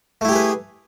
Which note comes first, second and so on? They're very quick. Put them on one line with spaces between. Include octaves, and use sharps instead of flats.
A3 E4 G4 G#4 B4